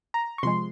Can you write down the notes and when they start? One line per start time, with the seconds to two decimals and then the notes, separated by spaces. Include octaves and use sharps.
0.14 A#5
0.38 C#6
0.43 C3 F3 G#3 C6